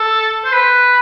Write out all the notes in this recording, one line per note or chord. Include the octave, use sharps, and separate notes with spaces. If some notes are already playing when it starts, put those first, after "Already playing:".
Already playing: A4
C5
B4